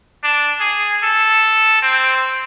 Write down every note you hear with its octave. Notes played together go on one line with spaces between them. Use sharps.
D4
G#4
A4
C4